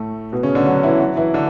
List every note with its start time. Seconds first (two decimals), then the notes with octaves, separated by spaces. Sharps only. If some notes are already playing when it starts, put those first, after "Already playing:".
Already playing: A2 A3
0.32 B2 B3
0.43 C#3 C#4
0.55 D3 D4
0.66 F#3 F#4
0.83 E3 E4
1.00 F#3 F#4
1.17 E3 E4
1.34 D3 D4